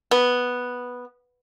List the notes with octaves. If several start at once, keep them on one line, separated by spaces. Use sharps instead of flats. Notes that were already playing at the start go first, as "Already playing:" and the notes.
B3